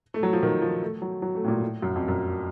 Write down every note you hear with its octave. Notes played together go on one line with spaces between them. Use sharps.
A3
F#3
F3
D#3
F3
A3
F#3
F#3
A3
A2
A#2
A2
F#2
F2
F#2